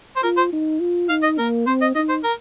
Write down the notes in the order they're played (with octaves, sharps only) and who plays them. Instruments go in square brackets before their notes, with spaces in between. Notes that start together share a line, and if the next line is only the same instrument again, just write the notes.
[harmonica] C5
[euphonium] F4 [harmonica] A#4
[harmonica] C5
[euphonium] D#4
F4
[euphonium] D#4 [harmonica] F5
[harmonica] D#5
[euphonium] A#3 [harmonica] A#4
[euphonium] C4 [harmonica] C5
[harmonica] D#5
[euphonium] D#4 [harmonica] D#5
[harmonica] C5
A#4